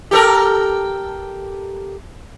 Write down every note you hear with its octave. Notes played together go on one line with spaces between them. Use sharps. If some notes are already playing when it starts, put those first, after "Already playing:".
G4 A4 A#4